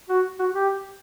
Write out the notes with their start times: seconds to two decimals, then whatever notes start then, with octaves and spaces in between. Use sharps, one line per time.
0.09 F#4
0.39 F#4
0.55 G4